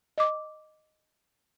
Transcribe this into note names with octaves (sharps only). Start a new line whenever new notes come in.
D#5 D6